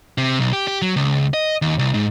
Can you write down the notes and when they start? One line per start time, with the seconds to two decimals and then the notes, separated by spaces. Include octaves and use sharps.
0.18 C3
0.40 B1
0.53 G4
0.67 G4
0.82 F#3
0.96 C#2
1.34 D#5
1.62 D#2
1.79 C2
1.94 G#2